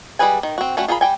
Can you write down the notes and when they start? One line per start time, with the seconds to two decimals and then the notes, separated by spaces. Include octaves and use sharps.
0.19 G3 G#3 G#4 B4 G#5
0.43 D#3
0.58 C4 F#4
0.77 G3 A3 C#4 F#4
0.88 F4 G#4 A#4 C#5 B5
1.01 G3 G5 G#5